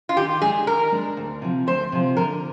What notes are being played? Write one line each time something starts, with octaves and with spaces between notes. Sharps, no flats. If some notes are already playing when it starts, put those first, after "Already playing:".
F4
D#3 G4
G#3 D4 G#4
D#3 A#4
G#3 D4
D2
C3 F3
D2 C5
C3 F3
D3 A#4